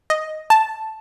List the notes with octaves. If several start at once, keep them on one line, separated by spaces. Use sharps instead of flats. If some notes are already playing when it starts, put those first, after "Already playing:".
D#5
A5